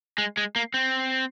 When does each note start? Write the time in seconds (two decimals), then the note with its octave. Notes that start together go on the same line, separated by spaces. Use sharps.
0.18 G#3
0.37 G#3
0.56 A#3
0.74 C4